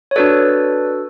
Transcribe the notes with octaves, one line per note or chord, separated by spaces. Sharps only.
C#5
D4 F#4 A4 B4 D5